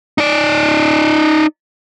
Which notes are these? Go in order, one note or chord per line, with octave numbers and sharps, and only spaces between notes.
D#4 D5